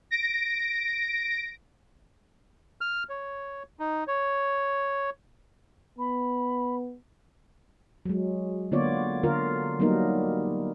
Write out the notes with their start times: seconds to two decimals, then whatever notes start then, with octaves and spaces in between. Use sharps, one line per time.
0.11 A#6 D7
2.81 F6
3.09 C#5
3.79 D#4
4.08 C#5
5.98 B3 B5
8.05 F#3 G#3
8.72 D3 A#3 B3 F4 C#5 D5
9.23 D3 F4 A#4
9.80 F#3 G3 A#3 B3 D#4 A#4